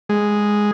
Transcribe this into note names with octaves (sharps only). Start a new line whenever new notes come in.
G#3